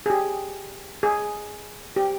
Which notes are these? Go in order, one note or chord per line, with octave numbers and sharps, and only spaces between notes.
G#4
G4
G#4
G4